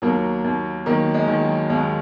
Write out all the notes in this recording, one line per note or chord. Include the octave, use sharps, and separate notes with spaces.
D#2 F#3 A#3
D#2
D#3 F#3 A#3
G#3
D#3
F#3
D#2 G#3